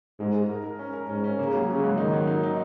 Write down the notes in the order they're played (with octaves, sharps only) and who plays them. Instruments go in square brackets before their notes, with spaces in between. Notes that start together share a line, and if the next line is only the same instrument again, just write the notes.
[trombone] G#2 [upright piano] G#3
[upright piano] G#3
A#4
A#4
C#4
A#4
[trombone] G#2 [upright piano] C#4
[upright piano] C#4
[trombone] C#3 [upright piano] A#3
[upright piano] F#3
[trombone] C#3 [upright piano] F#3
[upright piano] G#2
[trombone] D#3 [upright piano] D#4
[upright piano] F#3
D#4
D#4